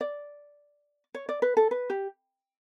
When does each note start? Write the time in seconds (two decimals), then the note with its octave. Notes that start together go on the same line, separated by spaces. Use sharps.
0.01 D5
1.14 C#5
1.29 D5
1.42 B4
1.57 A4
1.71 B4
1.90 G4